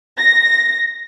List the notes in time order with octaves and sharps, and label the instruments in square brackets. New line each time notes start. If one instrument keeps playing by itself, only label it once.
[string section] A#6